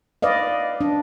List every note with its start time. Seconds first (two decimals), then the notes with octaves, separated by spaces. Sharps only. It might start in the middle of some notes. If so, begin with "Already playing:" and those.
0.22 B4 D5 D#5 F5
0.81 D4